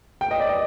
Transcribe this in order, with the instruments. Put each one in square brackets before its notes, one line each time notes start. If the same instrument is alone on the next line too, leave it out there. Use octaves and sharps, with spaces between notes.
[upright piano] G5
D#5
D5
D#5